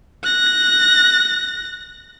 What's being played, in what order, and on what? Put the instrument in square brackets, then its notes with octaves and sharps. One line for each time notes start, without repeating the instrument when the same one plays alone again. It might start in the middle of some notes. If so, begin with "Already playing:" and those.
[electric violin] F#6 A#6